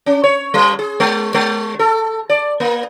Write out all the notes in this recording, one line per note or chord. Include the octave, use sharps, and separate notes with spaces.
C#4
C#5
G3
G#4
G#3
G#3
A4
D5
A#3